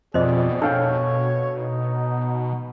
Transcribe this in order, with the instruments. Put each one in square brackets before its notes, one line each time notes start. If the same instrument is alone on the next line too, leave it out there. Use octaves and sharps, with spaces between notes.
[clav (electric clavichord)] F2 [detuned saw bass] B2 [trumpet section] G4 G#4 D5 [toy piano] C5 D#5
[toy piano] D4 [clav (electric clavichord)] A4 F5 G5 [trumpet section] C#5
[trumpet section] D#4